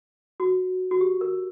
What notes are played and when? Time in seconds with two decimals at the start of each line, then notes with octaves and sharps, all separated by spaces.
0.40 F#4
0.91 F#4
1.01 G4
1.21 A#4